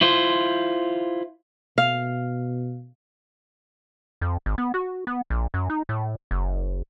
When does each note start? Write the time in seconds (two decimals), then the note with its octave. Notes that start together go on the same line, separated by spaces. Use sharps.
0.01 E4 F4 C5
1.78 B2 F5
4.21 F2
4.46 G#1
4.58 B3
4.74 F#4
5.07 B3
5.30 A#1
5.54 F#2
5.70 D#4
5.89 A2
6.31 F#1